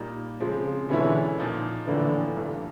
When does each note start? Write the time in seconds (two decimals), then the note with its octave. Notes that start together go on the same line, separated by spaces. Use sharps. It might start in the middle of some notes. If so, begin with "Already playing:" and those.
Already playing: A#2 G3 A#3 D#4
0.40 C#3 F3 G#3 C4
0.89 B2 D3 E3 G#3 C#4 E4
1.38 A#2 F3 A#3 D#4
1.86 A2 D3 E3 F3 A#3
2.36 G2 E3 A3 D4